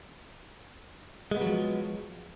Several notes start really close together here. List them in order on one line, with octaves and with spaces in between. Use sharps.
G#3 B3 F#3 F3